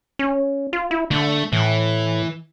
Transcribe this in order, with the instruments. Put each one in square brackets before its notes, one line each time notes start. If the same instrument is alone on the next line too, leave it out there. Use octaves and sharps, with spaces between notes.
[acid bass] C#4
F4
E4
[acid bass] D3 [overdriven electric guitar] A3
[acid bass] A2 [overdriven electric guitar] E3